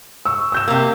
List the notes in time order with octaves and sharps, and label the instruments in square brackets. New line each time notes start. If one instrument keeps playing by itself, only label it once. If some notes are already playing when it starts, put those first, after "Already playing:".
[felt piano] C#6 E6
E6 G6 E7
[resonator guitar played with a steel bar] C3 A#3